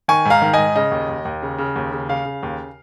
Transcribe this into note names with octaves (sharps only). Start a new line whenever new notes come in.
D#3 G#5 C#6
G#2
F5 A#5
D#3
G#2 D#5 G#5
C#3 D#5
D#2
D#2
D#2
C#3
C#3
D#2
C#3
C#3 F5
C#3
D#2